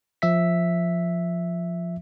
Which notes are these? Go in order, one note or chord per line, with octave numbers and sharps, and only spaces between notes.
F3 E5 B6